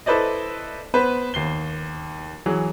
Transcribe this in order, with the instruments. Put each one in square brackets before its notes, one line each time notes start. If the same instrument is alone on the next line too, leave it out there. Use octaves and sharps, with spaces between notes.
[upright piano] E4 A4 B4 C5 D5 D#5
B3 B4 C5
D#2 C7 G7
E3 F#3 G#4